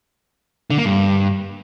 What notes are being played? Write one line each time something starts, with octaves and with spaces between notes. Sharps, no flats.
D3
A#3
G2